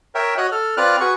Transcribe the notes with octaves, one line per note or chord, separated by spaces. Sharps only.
A#4 C#5 E5 G5
F#4 C#5 D#5 F#6
A4 F6
C4 F4 B4 D5 F6 F#6
F#4 G#4 B4 C#6